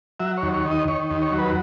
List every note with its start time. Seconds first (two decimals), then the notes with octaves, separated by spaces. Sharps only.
0.20 F#3 E5
0.37 D#2 C#5
0.54 C#5
0.65 D#3
0.71 D#5
0.88 D#3 C#5
1.10 D#2
1.22 C#5
1.32 F#3
1.39 B4